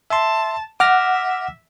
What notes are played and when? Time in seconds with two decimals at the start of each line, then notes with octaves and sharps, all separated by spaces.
0.10 E5 A5 C6
0.80 E5 F#5 D6 F6 A#6